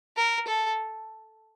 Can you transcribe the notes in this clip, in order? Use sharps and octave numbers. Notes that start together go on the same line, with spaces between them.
A#4
A4